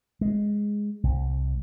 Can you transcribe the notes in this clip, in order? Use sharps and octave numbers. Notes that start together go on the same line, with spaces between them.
G#3
C2